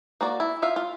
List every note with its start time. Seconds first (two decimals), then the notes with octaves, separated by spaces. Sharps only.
0.21 A#3 F#4 D5
0.40 E4
0.62 F4 E5 F5
0.76 F4